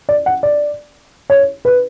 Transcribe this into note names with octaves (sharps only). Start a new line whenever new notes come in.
D5
F#5
D5
C#5
B4